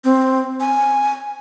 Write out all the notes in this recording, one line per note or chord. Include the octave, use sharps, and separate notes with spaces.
C4
G#5